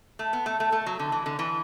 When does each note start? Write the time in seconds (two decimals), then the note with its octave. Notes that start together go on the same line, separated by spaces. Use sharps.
0.19 A3
0.33 B3
0.46 A3
0.60 A3
0.72 A3
0.86 F#3
0.99 D3
1.12 E3
1.26 D3
1.39 E3